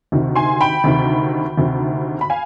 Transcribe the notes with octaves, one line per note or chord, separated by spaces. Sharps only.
D2 C3 D#3
G#5 C6
G5 B5
D2 C3 D#3
D2 C3 D#3
B5
F5 G#5